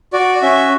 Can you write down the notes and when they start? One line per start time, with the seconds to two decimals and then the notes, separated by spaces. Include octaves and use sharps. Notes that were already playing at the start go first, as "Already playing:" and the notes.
0.13 F#4 D5
0.42 C#4 E5